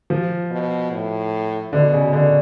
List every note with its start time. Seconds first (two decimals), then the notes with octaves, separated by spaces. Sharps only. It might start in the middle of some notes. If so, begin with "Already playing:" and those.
0.10 F3
0.51 B2
0.91 A2
1.73 B2 D3
1.93 C#3
2.13 D3